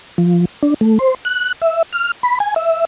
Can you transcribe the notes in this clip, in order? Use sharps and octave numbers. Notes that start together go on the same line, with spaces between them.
F3
D4
A3
C5
F#6
E5
F6
B5
G#5
E5